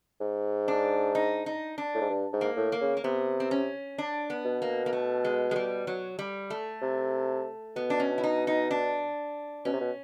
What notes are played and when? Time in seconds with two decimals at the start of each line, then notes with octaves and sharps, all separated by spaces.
0.21 G#2
0.68 D4
1.15 D#4
1.46 D#4
1.78 D4
1.94 A2
2.02 G#2
2.10 G2
2.33 G#2
2.41 A#3
2.57 A2
2.72 A#3
2.81 C#3
2.97 A#3
3.04 C3 B3
3.40 C4
3.51 C#4
3.98 D4
4.30 B3
4.45 B2
4.62 A#3
4.86 A#3
4.93 A3
5.25 G#3
5.51 G#3
5.56 G3
5.87 F#3
6.19 G3
6.50 A3
6.82 C3
7.76 B2 B3
7.90 D4
8.00 C#4
8.18 E4
8.24 D#4
8.47 D#4
8.71 D4
9.65 B2 C#4
9.73 C3
9.80 B2